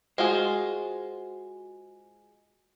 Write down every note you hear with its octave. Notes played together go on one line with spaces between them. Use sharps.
G#3 F4 F#4 G#4 C5